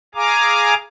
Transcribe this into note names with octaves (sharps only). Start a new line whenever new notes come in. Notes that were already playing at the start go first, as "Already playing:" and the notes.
G#4 F5 G#5 A#5 D6